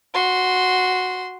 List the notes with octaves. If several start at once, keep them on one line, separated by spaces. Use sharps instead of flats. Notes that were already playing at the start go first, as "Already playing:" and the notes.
F#4 C6